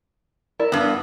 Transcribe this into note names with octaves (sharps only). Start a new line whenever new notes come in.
E4 A#4 D5
G2 B3